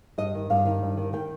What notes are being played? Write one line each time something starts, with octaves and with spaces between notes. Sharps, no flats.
G2 D#5
D#3
G2 F5
D#3
G2
D#3
D#3 G5